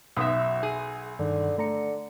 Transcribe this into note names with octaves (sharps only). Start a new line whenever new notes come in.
B1 F#2 E5 D#6
G#4
G2 D3 D#3
D3 A3 A#5 C#7